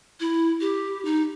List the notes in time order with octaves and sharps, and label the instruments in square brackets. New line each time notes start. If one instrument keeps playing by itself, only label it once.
[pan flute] E4
G4
D#4